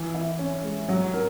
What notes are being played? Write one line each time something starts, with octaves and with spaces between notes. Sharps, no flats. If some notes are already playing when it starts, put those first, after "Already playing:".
Already playing: E3
E4
C#4
G#3
F#3
A#4